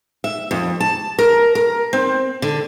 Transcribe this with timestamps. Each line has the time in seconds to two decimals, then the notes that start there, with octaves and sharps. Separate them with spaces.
0.24 E5
0.51 F2
0.80 A5
1.19 A#4
1.55 A#4
1.93 C4
2.42 D3